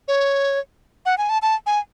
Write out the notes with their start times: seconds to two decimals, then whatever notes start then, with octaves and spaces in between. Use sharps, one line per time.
0.08 C#5
1.06 F#5
1.18 G#5
1.29 A5
1.42 A5
1.66 G#5